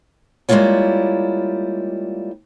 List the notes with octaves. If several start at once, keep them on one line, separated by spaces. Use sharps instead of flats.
G3 G#3 A#3 E4 F4 C#5